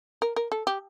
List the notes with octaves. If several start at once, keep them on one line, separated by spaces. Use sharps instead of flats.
A#4
A#4
A4
G4